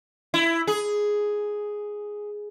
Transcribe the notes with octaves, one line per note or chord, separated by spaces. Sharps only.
E4
G#4